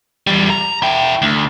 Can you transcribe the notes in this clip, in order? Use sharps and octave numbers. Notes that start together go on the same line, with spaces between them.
E2 G3
A#5
E4 G5
D2